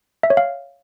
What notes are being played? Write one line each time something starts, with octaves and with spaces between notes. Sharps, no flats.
E5
C#5
F5